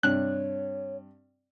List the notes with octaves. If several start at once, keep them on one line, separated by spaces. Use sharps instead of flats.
G2 C3 C#5 F#6